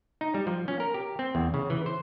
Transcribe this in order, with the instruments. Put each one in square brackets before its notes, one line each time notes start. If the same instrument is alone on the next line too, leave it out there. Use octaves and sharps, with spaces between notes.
[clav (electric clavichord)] D#4
G3
F3
C#4
A#4
G4
C4
E2
C#3
E3
C5